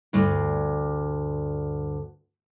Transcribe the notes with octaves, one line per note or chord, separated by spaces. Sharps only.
D2 G2